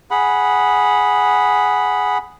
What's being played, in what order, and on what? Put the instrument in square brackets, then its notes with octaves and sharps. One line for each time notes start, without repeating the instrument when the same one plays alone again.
[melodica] G#4 F#5 B5